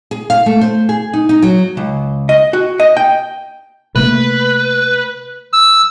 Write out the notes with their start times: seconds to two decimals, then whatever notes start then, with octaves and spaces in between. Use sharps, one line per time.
0.11 G#4
0.30 F5
0.46 A3
0.61 C5
0.89 G#4
1.13 D#4
1.29 D#4
1.42 F#3
1.77 C#2
2.29 D#5
2.53 F#4
2.80 D#5
2.97 G5
3.96 C3 A3 A#3 B4
5.53 E6